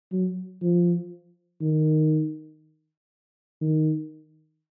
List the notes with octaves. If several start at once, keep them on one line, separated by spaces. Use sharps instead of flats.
F#3
F3
D#3
D#3